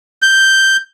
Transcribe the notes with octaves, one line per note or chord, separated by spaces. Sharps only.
G6